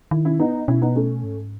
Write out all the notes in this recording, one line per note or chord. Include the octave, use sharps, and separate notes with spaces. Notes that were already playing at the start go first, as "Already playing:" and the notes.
D#3 E4
C#4 E4
B3 D#4
B2 C#4 E4
B3 D#4
A3 C#4
G#2